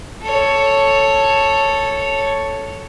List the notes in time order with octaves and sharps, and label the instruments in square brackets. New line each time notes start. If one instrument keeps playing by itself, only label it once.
[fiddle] A4 C#5